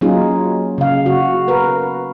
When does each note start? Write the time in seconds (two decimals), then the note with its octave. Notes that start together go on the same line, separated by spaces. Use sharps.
0.01 F#3 A#3 C#4 D#4 F4 G#4
0.78 C#3 F5
1.06 F#4
1.48 A#4 B4